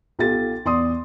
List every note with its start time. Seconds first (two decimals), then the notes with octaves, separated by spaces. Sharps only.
0.19 B1 F4 G4 A4 A6
0.65 E2 D5 C6 D#6